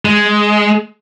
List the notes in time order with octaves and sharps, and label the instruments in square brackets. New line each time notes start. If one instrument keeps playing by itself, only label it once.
[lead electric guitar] G#3